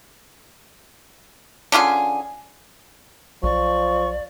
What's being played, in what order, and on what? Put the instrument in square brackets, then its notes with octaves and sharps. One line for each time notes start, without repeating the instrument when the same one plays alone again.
[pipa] D3 C#4 F4 G#4
[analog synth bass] B1 [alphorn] F3 [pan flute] D5 [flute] C#6